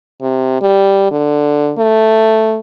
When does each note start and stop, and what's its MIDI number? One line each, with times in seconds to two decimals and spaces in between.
0.21 0.58 48
0.61 1.07 55
1.11 1.73 50
1.78 2.59 57